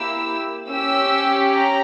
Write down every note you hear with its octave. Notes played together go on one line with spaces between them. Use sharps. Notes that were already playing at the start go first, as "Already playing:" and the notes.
Already playing: A#3 E4 G4 E6
C#4 G4 E6
A#5